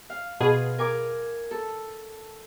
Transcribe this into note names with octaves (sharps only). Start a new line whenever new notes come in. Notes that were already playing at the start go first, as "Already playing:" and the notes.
F5
B2 F4 G#4
A#4 G#5 D6
A4